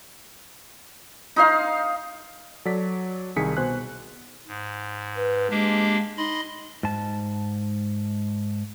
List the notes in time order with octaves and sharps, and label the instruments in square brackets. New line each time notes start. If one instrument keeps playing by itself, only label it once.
[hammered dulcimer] D#4 C5 F5
[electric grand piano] F#3 A4 D5 B6
C2 D#3 G#4 B6 C#7
B2 C5 G#5 F#6
[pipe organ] G#2
[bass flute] B4
[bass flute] G#3 [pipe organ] A#3 D4 G4
[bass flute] D#4 [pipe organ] D#5 B5 C6
[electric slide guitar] G#2 A5